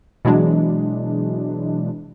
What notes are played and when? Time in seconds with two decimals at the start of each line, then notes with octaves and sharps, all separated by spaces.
0.25 B2 E3 F#3 G#3 D4